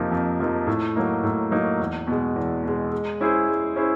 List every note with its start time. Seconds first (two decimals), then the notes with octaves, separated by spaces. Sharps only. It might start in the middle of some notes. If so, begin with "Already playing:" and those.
Already playing: F2 C3 F3 A#3 D#4
0.11 F2
0.39 C3 F3 A#3 D#4
0.67 A2
0.96 F#3 A#3 D#4
1.24 A2
1.51 F#3 A#3 D#4
1.80 E2
2.07 B2 G#3
2.36 E2
2.64 B2 G#3
2.92 G#3
3.21 C#4 E4 G#4 C5
3.49 G#3
3.76 C#4 E4 G#4 C5